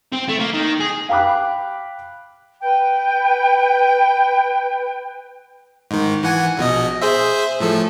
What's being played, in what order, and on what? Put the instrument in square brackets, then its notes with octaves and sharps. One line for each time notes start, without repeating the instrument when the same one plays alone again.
[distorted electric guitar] C4
A3
A#3
D#3
G#4
[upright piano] F5 G5 B5 D6 F#6
[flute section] B4 G5
[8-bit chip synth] G#2 D#3
E3 F#5 G#5
A#1 B2 D#5
G#4 C5 E5
A2 F3 A4